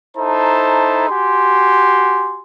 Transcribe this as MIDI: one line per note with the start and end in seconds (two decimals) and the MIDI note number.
0.17 1.09 63
0.17 1.09 64
0.17 1.09 69
0.17 1.09 72
0.17 1.09 81
0.17 1.09 82
1.09 2.43 66
1.09 2.43 67
1.09 2.43 80
1.09 2.43 84